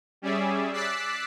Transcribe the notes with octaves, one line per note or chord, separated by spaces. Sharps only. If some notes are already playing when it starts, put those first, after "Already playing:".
G3 C#4 G#4 D5 E5
D6 E6 F#6 A6 B6 C7